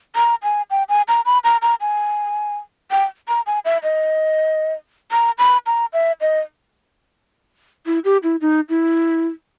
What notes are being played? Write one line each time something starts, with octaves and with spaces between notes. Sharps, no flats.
A#5
G#5
G5
G#5
A#5
B5
A#5
A#5
G#5
G5
A#5
G#5
E5
D#5
A#5
B5
A#5
E5
D#5
E4
G4
E4
D#4
E4